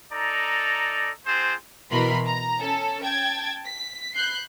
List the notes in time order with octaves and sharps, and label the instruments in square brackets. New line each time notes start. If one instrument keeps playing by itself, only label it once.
[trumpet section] D#4 A4 D5 A#5
C4 F4 G#4 C5
[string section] B2 E3 A#4 B5 C6
A#5
C#4 A4
G5 A5 G#6
B6
B5 F#6 G6 C7